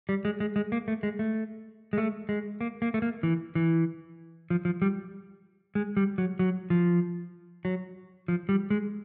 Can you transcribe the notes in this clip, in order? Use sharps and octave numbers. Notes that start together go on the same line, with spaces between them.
G3
G#3
G#3
G#3
A#3
A3
G#3
A3
G#3
A3
G#3
A#3
A#3
A3
A#3
E3
E3
F3
F3
G3
G#3
G3
F#3
F#3
F3
F#3
F3
G3
G#3